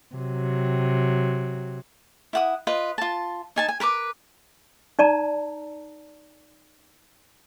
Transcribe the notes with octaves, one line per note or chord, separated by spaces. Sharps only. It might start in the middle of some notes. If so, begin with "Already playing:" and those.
C3 F#3
E4 F#5 D#6
F4 B4 D#5 B5
F4 A5
D#4 G#5 A5
G#5
A#4 B4 B5 D6
D#4 D5 A5 A#5